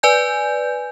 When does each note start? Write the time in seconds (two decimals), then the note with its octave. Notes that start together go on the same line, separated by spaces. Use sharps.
0.03 B4 D5 G#5 G6